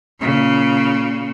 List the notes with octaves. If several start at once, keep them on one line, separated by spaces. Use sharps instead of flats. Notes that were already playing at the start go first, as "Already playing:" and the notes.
A#2 C#3